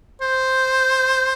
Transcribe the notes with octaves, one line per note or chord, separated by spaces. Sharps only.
C5